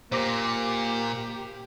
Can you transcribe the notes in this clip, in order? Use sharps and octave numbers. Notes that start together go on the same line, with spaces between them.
A#2 A#3 G4 C5 D6 A#6